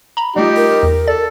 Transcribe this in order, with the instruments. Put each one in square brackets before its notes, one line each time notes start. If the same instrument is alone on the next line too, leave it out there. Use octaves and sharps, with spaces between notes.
[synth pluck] A#5 B5
[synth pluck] G3 A3 F4 [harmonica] D#4 G4
[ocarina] A#4
[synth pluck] E2
[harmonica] A4 [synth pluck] D5 A6